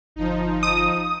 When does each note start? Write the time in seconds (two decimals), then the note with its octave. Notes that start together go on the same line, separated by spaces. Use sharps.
0.16 G1 F3 D#4
0.63 D#6